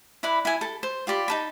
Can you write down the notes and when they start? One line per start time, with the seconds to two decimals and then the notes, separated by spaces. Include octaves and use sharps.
0.23 E4 B4 D5 B5
0.45 E4 G#5
0.61 A4 A5
0.83 C5
1.07 F4 G4 D5 B5
1.28 D#4 A5 B5